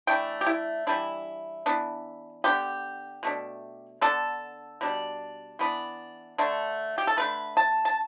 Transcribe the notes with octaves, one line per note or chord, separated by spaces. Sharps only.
E3 A3 D4 G5
G4
E4
E3 G3 D4 E4
E3 B3 D4
D3 B3 D4 G4
B2 A3 D4
D3 B3 D4 A4
B2 G3 D4
E3 B3 D4
D3 A3 D4
G4
A4
D3 A3 D4 B4
A5
A5